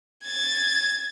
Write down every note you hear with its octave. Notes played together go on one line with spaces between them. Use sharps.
G#6 A6